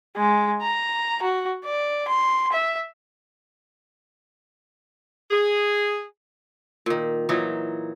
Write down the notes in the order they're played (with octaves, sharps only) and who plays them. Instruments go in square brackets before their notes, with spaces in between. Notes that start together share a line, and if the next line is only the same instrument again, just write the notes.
[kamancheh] G#3
A#5
F#4
D5
C6
E5
[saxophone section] G#4
[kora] A#2 D#3
A#2 E3 F#3 D#4